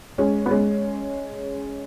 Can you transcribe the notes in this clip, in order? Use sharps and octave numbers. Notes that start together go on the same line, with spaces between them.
G#3 C#4
B3
G#3 C#4